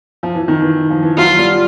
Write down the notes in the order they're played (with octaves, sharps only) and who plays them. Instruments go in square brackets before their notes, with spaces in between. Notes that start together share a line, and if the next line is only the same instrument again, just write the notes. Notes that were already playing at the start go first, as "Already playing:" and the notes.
[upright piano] F3
E3
D#3
E3
F3
E3
[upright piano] F#3 [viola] F4
[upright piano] G3